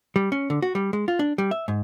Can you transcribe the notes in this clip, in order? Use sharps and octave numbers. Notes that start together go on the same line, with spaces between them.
G3
C#4
D3
F#4
G3
G#3
F4
D4
G3
E5
G#2